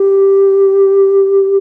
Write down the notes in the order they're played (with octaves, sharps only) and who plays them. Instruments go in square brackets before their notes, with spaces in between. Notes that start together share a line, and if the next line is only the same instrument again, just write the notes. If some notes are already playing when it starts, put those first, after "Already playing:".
Already playing: [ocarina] G4